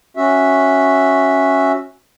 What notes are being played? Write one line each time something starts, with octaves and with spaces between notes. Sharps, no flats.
C#4 F#4 E5